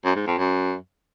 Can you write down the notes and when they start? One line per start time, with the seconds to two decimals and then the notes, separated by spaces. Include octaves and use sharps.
0.05 F#2
0.16 G#2
0.27 F2
0.38 F#2